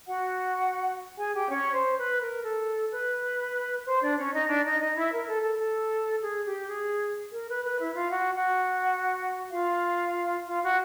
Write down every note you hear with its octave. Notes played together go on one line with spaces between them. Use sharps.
F#4 F#5
G#4 G#5
G4 G5
C#4 C#5
C5
B4
A#4
A4
B4
C5
D4 D5
C#4 C#5
D#4 D#5
D4 D5
D#4 D#5
D#4 D#5
E4 E5
A#4
A4
A4
A4
G#4
G4
G#4
A#4
B4
B4
E4 E5
F4 F5
F#4 F#5
F#4 F#5
F4 F5
F4 F5
F#4 F#5